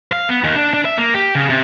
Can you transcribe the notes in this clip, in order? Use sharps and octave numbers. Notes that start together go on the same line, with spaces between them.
F5
B3
D#2
D4
D4
E5
A#3
G4
C#3
C3